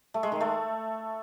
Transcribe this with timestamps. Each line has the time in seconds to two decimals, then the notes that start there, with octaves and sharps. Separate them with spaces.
0.14 A3
0.23 G#3
0.32 D#3
0.41 A3